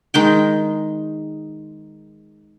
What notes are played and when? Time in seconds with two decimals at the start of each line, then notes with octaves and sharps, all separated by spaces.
0.14 D#3 G#3 G5